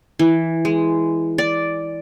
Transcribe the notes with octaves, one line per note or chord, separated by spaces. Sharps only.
E3
G#3
D5